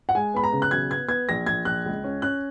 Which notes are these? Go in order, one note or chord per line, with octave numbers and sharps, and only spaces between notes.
F#5
G#3 G#5
B3 B5
A#5
C#3
F#6
B1 G#6
B3 G#6
B3 G#6
A#1 A#6
A#1 G#6
A#1 F#6
C#2
C#4
C#4 F#6